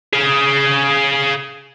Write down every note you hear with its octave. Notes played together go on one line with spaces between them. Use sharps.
G#4 F5